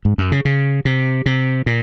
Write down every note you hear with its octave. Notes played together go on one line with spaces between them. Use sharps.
G#2
F#2
C#3
C#3
C3
C3
A#2